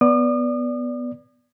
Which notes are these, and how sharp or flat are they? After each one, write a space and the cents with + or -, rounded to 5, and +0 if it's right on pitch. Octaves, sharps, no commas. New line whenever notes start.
B3 +0 D5 -10 D#6 -40